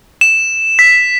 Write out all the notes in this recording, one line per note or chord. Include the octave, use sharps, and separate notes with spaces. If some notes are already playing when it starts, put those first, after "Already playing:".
E7
B6